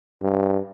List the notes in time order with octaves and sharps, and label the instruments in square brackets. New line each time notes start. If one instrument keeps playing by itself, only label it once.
[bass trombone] G2